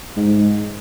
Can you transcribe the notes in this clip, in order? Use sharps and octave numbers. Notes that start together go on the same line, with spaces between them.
G#2